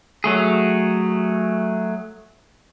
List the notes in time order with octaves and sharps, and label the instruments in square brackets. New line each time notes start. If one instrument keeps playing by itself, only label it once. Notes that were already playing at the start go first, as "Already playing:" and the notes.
[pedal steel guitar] F#3 A3 G#4